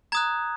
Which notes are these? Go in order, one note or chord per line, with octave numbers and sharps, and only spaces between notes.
A#5 D#6 F#6 G#6